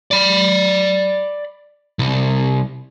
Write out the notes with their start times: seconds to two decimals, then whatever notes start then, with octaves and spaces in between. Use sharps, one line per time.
0.11 D5 B5
1.99 C2